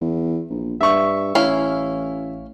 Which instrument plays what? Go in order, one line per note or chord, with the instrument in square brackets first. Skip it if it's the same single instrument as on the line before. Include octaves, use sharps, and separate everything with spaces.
[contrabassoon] E2
A#1
[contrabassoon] G2 [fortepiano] E5 C#6
[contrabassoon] A1 [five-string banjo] C#4 E4 F5